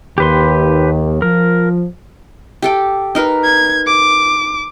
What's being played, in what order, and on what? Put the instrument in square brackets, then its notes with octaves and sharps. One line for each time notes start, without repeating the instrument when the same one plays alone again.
[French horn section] D#2 [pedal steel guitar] G4 B4 C6
[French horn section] F3 [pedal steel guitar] A#4
[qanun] G4 A4 G5
D#4 A#4 B4
[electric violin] G#6
D6